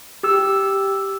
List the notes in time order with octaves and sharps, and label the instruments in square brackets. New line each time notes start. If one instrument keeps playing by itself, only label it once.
[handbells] G4 E6